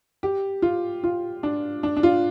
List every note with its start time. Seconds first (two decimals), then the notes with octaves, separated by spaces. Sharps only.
0.23 G4
0.62 F4
1.04 F4
1.43 D4
1.83 D4
1.97 D4
2.03 F4